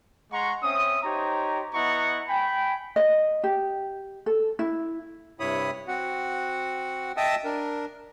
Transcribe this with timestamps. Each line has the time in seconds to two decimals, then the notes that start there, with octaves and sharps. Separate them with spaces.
0.32 G#3 F#5 A#5 C6 C#6
0.63 C4 C#4 E5 D#6
1.03 D#4 G4 C5 C#5 A#5
1.74 B3 E4 D#5 F#5 A#5 C#6
2.29 G5 G#5 B5
2.96 D#5
3.44 G4
4.26 A4
4.59 E4
5.40 G2 C3 E4 C#5 B5 D#6
5.88 C4 F#4 F#5
7.17 D#5 E5 G5 A5 D#6 E6
7.45 D4 A#4